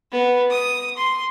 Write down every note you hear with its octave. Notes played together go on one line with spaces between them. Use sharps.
B3
D#6
C6